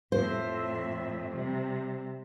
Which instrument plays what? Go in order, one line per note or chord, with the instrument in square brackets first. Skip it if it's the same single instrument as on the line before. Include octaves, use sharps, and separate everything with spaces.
[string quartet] F2 A2 E5 [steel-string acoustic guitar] C5
[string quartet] C3 G3